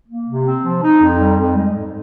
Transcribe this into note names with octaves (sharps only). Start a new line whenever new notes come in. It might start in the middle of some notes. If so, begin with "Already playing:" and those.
A#3
C3
C4
F3
D#4
F2
G3
F2
G#3
G#2